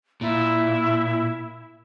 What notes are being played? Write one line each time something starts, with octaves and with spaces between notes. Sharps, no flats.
A#2 E4